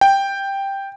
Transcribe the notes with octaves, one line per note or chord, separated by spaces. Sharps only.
G5